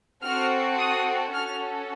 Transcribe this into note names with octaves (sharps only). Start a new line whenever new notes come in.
C4 F#4 A4 F6
D#6
C#4 F#4 A4 F6